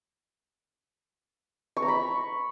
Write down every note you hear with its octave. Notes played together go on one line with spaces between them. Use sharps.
C#6
A#5
B5